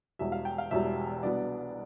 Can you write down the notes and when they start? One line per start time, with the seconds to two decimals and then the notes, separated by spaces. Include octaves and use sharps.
0.19 E1 E2 B2 G3 E5
0.32 F5
0.45 G5
0.58 F5
0.71 E1 E2 B2 G3 E5
1.23 C2 B2 B3 D4 D5